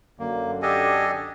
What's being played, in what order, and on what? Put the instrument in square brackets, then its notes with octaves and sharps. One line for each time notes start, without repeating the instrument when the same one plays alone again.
[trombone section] F#2 D3 [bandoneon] A#3
[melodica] D4 A4 D#5 [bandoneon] G4 G#5